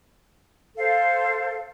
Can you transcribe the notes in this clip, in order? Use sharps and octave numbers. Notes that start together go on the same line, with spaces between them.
A4 C5 F5